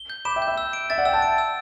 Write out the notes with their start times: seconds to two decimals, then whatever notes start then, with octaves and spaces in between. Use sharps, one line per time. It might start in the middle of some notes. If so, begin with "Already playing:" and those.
Already playing: G7
0.10 G6
0.25 B5 D6 E7
0.36 E5 G5
0.42 G6
0.47 E5
0.58 E6
0.73 D7
0.90 E5 A6
0.98 D5 F#5
1.05 E5 G5 E6
1.13 F#5 A5
1.22 D7
1.38 E6